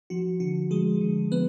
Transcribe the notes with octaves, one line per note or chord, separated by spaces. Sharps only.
F3 F#4
D3 F#4
F3 G#3 G#4
D3
F3 B3 B4